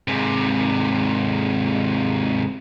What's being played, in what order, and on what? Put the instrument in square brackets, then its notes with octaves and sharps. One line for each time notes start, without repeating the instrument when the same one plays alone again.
[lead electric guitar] G#2 C3